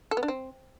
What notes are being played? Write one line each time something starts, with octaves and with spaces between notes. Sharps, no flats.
A4
B3
D4
C4